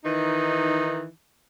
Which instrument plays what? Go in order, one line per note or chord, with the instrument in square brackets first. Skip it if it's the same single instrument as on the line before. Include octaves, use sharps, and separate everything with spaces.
[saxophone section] D#3 E3 D#4